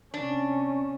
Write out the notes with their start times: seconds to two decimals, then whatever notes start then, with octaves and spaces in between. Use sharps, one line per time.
0.14 C3 C#4 D4